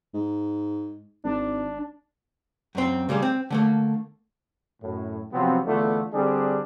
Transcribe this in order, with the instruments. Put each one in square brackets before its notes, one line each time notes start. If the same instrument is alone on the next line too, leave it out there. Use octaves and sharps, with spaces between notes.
[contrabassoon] G#2
[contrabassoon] G#1 [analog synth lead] D4
[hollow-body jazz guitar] F#2 C4
C#3 G3 G#3 A#3
C4
D3 A3 A#3
[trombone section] F#2 A2
C3 F3 F#3 B3 C4
E2 D3 A3 B3 D4 F4
D3 G3 C4 D4 G#4